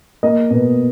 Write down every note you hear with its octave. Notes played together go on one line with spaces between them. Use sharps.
A#3 D#5
B2